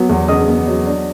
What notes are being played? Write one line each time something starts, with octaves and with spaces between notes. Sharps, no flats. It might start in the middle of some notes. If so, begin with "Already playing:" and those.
Already playing: F#3 B3
E2
C#3 D#5 D#6
B3
F#3
D4